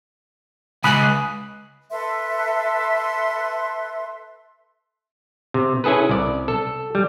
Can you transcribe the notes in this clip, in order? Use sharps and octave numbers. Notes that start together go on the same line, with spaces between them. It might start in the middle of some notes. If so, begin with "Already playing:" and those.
C#2 G#5 B5 D#6 F#6
A4 B4 E5 C6
C3
C#4 E4 G#4 A4 B4
C2 D5
A4
G3